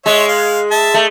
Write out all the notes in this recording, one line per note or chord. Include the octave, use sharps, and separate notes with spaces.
G#3 C#5 E5
F5
E5 A5
A3